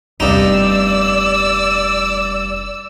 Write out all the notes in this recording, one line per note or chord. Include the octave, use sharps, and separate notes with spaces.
F1 E2 G2 D#4 D5 E6